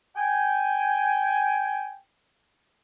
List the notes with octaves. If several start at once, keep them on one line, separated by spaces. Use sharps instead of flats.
G5 G#5